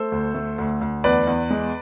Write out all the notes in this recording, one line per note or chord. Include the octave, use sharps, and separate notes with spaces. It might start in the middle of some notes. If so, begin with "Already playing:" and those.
Already playing: A3 A4 C5
D2
A3
D2
D2
E2 B4 D5
E2
G#3